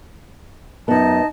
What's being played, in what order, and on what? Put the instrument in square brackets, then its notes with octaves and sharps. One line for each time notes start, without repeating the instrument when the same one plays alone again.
[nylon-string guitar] F#2 B3 [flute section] D#4 D#5 A5